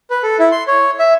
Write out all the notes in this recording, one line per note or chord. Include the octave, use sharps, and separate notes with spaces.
B4
A4
E4
C6
C#5
E5